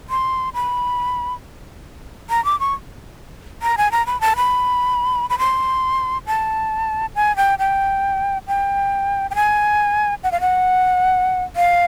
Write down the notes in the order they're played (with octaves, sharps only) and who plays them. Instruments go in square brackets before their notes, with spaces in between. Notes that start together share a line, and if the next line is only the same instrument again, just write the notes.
[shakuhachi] C6
B5
A#5
D6
C#6
A#5
G#5
A#5
B5
A5
B5
B5
C6
A5
G#5
G5
G5
G5
G5
G#5
F#5
F5
F#5
F5